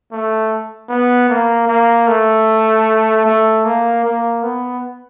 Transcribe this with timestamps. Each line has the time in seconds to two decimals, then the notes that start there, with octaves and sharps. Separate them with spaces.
0.12 A3
0.89 B3
1.29 A#3
1.68 A#3
2.07 A3
3.26 A3
3.65 A#3
4.04 A#3
4.43 B3